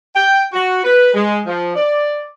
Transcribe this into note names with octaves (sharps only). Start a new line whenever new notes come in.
G5
F#4
B4
G#3
F3
D5